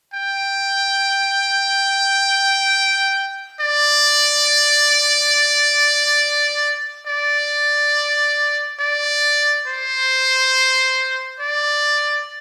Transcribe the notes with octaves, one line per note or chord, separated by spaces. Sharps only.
G5
D5
D5
D5
C5
D5